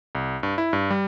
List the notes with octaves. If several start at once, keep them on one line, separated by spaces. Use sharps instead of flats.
C2
G2
E4
G2
G3